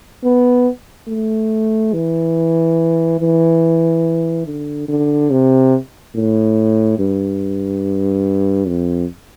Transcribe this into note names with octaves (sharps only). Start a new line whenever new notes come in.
B3
A3
E3
E3
D3
D3
C3
A2
G2
F2